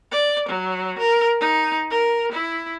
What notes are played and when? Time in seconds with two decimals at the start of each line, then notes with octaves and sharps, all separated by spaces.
0.11 D5
0.49 F#3
0.98 A#4
1.40 D#4
1.90 A#4
2.32 E4